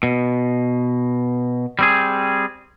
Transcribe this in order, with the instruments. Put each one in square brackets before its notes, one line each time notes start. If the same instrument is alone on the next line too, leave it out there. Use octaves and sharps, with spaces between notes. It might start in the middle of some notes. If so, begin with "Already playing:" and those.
[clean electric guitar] B2
G3 C4 G#4